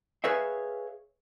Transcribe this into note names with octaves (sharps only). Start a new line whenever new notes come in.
G#4 B4 C#5 E5 F5